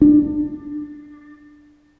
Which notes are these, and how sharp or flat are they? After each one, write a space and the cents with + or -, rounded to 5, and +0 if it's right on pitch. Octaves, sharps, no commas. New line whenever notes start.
D4 +15